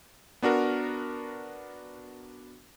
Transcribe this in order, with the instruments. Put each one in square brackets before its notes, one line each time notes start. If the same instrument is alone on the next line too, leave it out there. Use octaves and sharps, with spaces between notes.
[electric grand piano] B3 D4 F#4 A#4